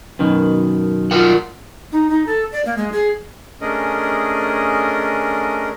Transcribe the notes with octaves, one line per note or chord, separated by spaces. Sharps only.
F#2 B2 D#3
F4 A#4 F#5
D#4
D#4
A4
D5
A#3
G#3
G#4
A3 C#4 D4 G#4 A#4 D#5